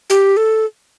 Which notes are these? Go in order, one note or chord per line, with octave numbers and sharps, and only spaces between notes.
G4
A4